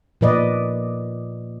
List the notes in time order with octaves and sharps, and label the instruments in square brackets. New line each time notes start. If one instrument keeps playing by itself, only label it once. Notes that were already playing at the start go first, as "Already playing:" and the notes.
[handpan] A#2 F3 B4 D5 D#5